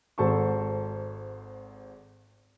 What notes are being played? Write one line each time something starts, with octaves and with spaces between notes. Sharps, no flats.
G#1 G#2 A4 C5 A5 C#6